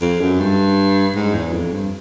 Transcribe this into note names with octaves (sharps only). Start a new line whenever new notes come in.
F2
F#2
G2
G#2
E2
F2
G2